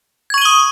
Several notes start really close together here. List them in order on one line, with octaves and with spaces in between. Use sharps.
G#6 C#6 D#7 G7 D#6